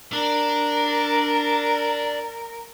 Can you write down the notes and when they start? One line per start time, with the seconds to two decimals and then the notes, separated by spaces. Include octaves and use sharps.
0.13 D4 A#4